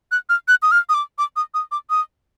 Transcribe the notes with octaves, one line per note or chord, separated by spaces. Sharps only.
F#6
F6
F#6
D#6
F6
D#6
D6
D6
D#6
D#6
D6
D#6